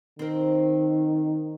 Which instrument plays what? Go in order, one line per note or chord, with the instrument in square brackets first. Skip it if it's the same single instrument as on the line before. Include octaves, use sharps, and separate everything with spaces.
[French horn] D#3 [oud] C4 A#4